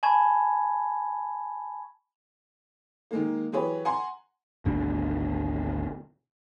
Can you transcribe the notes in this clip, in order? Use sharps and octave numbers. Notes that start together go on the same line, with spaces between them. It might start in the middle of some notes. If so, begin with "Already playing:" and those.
G#5 A5 B5 C#6 G#6
D#3 G#3 A#3
E3 F#3 G4 G#4 B4 C#5
F#5 G#5 A#5 C6
G#1 D2 B2 D4